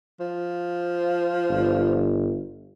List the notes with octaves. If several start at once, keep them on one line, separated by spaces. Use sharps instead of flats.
F3
G1